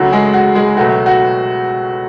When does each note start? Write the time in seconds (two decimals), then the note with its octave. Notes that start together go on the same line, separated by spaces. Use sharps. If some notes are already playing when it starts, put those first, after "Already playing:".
Already playing: F#2 C#3 F#3 A3 F#4
0.12 G#3 G#4
0.34 F#4
0.55 G#3 G#4
0.77 C#2 B2 F#3 A3 F#4
1.06 F#4